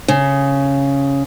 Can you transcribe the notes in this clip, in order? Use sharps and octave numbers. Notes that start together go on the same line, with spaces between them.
C#3